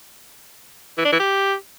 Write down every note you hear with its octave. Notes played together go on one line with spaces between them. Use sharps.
E3
D4
E3
G4